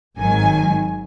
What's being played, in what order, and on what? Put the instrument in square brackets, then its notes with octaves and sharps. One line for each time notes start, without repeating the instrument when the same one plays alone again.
[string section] G#1 G#2 D#3 F#3 G#5